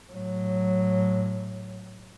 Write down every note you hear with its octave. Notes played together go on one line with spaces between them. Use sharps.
A2 F#3